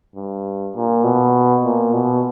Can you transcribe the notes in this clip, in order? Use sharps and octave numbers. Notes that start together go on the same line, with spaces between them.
G2
A#2
B2
A#2
B2